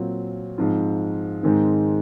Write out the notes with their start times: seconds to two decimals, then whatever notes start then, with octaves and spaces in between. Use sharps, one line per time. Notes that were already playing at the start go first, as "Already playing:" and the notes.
Already playing: A#2 F#3 C4
0.58 G#2 F3 C4 F4
1.43 G#2 D#3 G#3 C4